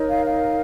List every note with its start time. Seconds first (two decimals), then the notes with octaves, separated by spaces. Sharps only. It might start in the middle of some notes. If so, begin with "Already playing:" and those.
Already playing: D#4 A#4 C#5
0.08 F5
0.25 F5